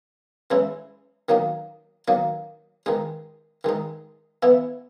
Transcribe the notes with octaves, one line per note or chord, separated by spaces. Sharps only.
E3 G#3 C#4 E4
D#3 F#3 A#3 D#4
D#3 F#3 A#3 D#4
D#3 G#3 D#4
D#3 G#3 D#4
E3 B3 E4